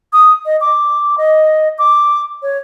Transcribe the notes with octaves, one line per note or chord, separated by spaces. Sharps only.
D#6
D#5
D6
D#5
D6
C#5